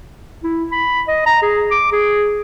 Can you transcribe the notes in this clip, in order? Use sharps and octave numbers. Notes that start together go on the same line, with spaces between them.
E4
B5
D#5
A#5
G#4
D6
G#4